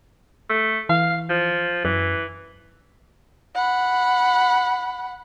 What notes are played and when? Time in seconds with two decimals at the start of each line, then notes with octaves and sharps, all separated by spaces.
0.50 A3
0.89 E3 F5
1.29 F3
1.85 F#2 E3
3.55 F#5 B5